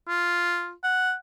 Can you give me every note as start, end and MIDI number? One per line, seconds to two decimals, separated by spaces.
0.08 0.72 65
0.83 1.14 78